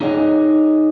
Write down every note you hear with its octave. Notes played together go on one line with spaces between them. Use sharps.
D#4 G#4 C#5 D#5 F5 G#5